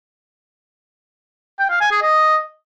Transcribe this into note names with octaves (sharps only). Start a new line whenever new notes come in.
G5
F5
G#5
G#4
D#5